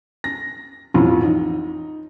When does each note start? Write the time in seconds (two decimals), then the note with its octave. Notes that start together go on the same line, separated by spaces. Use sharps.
0.24 A#6
0.94 A1 F2 A2 E3 F3
1.23 D#4